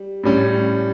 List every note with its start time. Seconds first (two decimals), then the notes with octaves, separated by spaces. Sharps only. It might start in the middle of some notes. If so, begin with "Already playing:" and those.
Already playing: G3
0.24 A2 G3 C#4